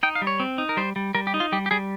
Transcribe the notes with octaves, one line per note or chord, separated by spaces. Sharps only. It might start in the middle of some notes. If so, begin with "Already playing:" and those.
D#4 G5
F5
G3
C#5
C4
D#4
A#4
G3 C5
G3
G3 A#4
G4
D#4
F4
G3 G4
G4
G3 G#4